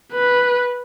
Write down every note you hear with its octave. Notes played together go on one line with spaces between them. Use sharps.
B4